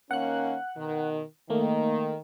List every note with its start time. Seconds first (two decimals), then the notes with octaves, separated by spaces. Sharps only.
0.11 D#3 A#3 C#4 F#5 F#6
0.77 B2 D#3
1.50 D#3 A3 A#3